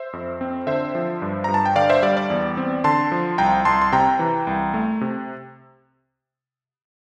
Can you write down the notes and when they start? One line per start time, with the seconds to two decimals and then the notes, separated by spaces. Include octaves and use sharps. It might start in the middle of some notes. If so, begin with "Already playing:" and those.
Already playing: C5 E5
0.13 F2
0.41 C4
0.67 D3 C5 E5
0.95 F3
1.22 G2
1.44 G2 A#5
1.54 A5
1.66 G5
1.75 D3 D5 F5
1.90 C5 E5
2.02 G3 D5 F5
2.17 D5
2.30 E2
2.57 C4
2.84 D3 A5 C6
3.12 F3
3.38 C2 G5 A#5
3.65 C2 A5 C6
3.82 C6
3.92 C3 G5 A#5
4.19 E3
4.47 C2
4.74 A3
5.01 C3